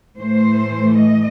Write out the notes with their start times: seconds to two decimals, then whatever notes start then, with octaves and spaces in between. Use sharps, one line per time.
0.18 A2 E3 A3 C5
0.99 D#5